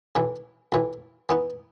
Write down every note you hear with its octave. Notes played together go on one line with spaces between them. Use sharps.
B1 A2 E3
B1 A2 E3
E3 B3 D#4